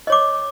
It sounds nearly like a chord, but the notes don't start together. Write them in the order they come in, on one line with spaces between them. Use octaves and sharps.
D#5 C#5 D6